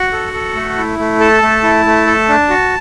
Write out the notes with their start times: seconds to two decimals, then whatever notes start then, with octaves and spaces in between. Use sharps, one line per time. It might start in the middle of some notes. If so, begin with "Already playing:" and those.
Already playing: F#4 F#5
0.12 A4
0.33 A4
0.55 A3
0.78 E4
0.99 A3
1.20 A4 A5
1.42 A3
1.63 E4
1.85 A3
2.07 A4
2.29 D4
2.50 F#4